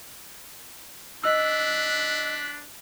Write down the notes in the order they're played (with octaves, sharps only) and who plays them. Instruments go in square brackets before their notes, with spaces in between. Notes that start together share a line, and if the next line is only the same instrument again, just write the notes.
[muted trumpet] D4 [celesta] D#5 E6 [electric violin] F#6 B6